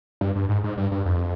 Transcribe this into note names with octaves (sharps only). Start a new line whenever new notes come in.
G2
G2
G#2
G#2
G2
G2
F2